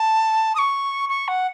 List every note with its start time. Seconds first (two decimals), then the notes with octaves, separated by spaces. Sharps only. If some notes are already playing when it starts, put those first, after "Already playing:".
Already playing: A5
0.55 D#6
0.59 C#6
1.09 C#6
1.28 F#5